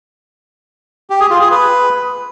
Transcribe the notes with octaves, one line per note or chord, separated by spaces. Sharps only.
G4
G#4
F4
G#4
B4